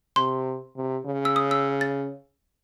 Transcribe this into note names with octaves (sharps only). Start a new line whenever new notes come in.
C3 C6
C3
C#3
E6
D#6
E6
A6